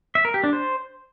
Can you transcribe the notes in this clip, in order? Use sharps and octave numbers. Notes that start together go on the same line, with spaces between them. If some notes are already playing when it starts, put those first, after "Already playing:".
E5
A#4
G4
D4
C5